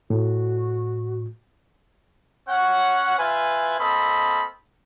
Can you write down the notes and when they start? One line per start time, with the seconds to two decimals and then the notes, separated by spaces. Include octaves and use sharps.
0.10 A2 F#4
2.49 C#4 C#5 F#5
3.18 F4 B4 E5 G#5
3.80 A#3 C4 A4 D#5 B5